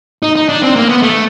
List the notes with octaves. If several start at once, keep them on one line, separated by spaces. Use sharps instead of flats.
D#4
D#4
D4
C4
A#3
B3
A3